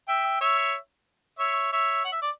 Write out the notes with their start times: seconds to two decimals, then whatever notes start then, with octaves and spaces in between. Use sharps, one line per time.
0.08 E5 G5
0.41 C#5 E5
1.39 C#5 E5
1.72 C#5 E5
2.05 F#5
2.12 E5
2.22 D5